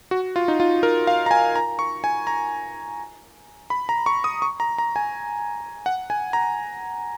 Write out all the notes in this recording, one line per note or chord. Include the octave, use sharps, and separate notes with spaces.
F#4
F4
D#4
F4
A#4
F5
A#5
G#5
A#5
C#6
G#5
A#5
B5
A#5
C#6
D#6
C#6
A#5
A#5
G#5
F#5
G#5
A#5